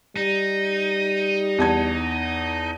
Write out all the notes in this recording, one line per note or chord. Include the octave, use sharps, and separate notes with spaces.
G3 D#4
E2 A5 G#6